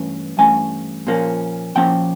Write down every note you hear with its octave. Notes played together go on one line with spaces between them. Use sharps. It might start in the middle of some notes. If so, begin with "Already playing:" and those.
Already playing: G2 E3 A3 C#4
G2 E3 A3 C#4 G#5
A#2 F3 A#3 C#4
A#2 F3 A#3 C#4 G5